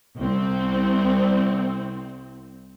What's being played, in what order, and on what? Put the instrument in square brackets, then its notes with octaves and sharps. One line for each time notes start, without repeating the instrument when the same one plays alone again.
[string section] C2 C4